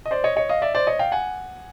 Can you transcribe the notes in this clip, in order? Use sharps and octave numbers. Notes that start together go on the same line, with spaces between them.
D#5
C5 D5
C#5 D#5
C#5 D#5
D#5 F5
D5 E5
C5 D5
C#5 D#5
F5 G5
F#5 G#5